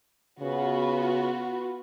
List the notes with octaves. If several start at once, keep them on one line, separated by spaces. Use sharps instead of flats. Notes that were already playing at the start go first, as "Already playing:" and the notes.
C#3 B3 F4 F#4